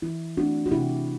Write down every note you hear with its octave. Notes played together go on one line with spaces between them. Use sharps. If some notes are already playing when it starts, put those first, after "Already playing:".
E3 E4
A3 C4 D4 F#4
F#4
C3 E4 G4